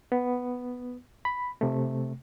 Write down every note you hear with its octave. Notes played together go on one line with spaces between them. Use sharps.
B3
B5
C3 A3